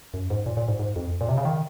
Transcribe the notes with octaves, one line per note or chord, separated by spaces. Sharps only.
F#2
G#2
A#2
A#2
G#2
G#2
F2
A#2
C3
C#3
D#3